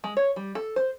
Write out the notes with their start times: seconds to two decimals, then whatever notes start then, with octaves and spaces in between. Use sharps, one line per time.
0.04 G#3
0.17 C#5
0.36 G3
0.55 A4
0.76 C5